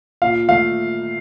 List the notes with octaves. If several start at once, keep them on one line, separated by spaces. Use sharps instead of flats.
A#2 F5
A3 F5